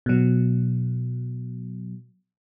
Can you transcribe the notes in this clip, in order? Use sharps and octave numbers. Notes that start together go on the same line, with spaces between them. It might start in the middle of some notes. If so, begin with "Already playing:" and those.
B2 F#3